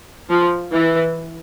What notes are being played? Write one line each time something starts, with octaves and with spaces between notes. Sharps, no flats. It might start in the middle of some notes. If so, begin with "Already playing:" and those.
F3
E3